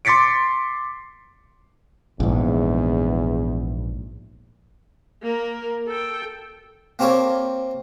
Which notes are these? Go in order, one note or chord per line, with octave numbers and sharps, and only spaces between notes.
C6 D6 A6 B6 C#7 D7
A#1 E2 G#2
A#3 A#4
A4 G5
A#3 C4 F4 G4 A4 C#5